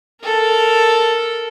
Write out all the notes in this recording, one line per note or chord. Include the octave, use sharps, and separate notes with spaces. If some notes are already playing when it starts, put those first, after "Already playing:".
A4 A#4